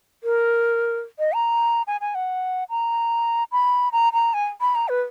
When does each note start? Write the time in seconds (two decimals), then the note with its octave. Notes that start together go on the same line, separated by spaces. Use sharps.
0.24 A#4
1.19 D#5
1.33 A#5
1.87 G#5
2.01 G#5
2.15 F#5
2.70 A#5
3.52 B5
3.92 A#5
4.13 A#5
4.34 G#5
4.61 B5
4.75 A#5
4.89 B4